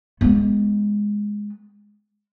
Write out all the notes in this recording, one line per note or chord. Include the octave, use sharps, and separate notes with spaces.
G#3 B3